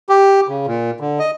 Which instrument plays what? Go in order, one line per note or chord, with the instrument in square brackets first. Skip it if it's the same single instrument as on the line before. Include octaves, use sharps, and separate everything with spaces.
[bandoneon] G4
C#3
A#2
D3
D#5